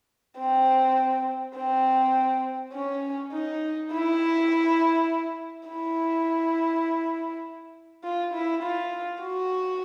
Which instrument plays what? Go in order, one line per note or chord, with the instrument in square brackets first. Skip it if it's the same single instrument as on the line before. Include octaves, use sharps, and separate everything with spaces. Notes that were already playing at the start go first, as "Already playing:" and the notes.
[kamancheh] C4
C4
C#4
D#4
E4
E4
F4
E4
F4
F#4